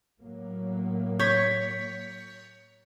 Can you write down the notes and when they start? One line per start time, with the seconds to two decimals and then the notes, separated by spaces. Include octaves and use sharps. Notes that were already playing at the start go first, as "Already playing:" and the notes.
0.21 A2 F#3 A#3
1.19 C#5 G6 B6